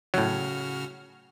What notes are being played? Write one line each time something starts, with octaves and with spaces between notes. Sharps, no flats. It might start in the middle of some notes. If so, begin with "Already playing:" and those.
A2 C#3 F#3 F#4 F6